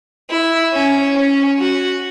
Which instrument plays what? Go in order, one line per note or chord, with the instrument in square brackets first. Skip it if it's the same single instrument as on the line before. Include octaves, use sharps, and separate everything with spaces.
[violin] E4
C#4
C#4
F#4